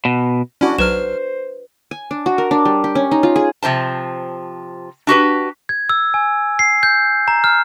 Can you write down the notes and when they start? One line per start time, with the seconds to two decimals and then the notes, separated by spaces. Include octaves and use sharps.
0.05 B2
0.61 C#4 D4 E4 F#4
0.78 B1 F#3 B4 C5 F6 E7
1.91 G#5
2.11 D4
2.26 F#4
2.38 A#4
2.51 D4
2.65 G3
2.84 G4
2.95 C#4
3.11 D#4
3.23 F4
3.36 G#4
3.63 C3 F3 C5 A5
5.07 D4 F#4 G4 B4
5.69 G#6
5.89 E6
6.14 G#5
6.59 C7
6.83 G6
7.28 A#5
7.44 F6